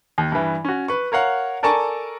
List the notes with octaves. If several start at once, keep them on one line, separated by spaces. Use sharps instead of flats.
D#2
G2 E3
C#4 F#4
B4 C#6
A#4 C#5 F5 F#5
A4 A#4 D5 G#5 A5 C#6